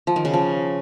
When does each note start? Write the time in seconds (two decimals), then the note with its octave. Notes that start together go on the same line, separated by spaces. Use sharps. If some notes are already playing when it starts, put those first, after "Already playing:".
0.07 F3
0.16 D#3
0.25 C#3
0.34 F3